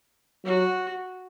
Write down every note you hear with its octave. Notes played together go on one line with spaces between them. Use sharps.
F#3 F#4